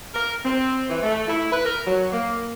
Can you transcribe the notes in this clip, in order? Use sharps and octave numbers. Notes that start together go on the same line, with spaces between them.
A#4
C4
E3
A3
E4
B4
A#4
F#3
A#3